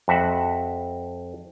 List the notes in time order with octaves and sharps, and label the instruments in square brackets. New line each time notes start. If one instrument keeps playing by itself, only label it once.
[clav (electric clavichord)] F2 F#4 E5 F#5